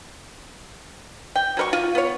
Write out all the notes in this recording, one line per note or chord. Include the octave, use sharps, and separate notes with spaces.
G5
F#3 A#4 C#6
F4
B3 C#5